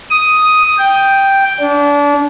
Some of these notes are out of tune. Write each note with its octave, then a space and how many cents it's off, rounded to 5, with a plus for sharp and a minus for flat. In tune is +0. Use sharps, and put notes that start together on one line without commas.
D#6 +5
G5 +0
D4 -30